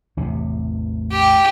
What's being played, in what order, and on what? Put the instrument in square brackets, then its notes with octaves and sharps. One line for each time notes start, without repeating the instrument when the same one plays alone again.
[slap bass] A1 E2 C3
[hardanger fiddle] G4